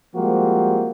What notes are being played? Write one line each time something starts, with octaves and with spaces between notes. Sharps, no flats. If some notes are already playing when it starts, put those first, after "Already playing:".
F3 G3 G#3 A#3 C4 F#4